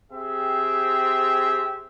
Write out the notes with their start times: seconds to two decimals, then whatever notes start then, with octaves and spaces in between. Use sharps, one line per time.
0.12 C4 G4 G#4 E5